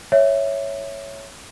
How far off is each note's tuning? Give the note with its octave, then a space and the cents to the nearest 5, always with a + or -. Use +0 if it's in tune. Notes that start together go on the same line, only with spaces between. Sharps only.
C#5 +0 E5 +0